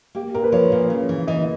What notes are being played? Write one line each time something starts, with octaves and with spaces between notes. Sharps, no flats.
A#3 G4
A#2 A#4
B4
F3 C#5
A#2
C#3
E3
E3 D#5